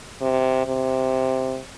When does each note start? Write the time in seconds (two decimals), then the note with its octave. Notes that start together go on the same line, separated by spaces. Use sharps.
0.21 C3
0.66 C3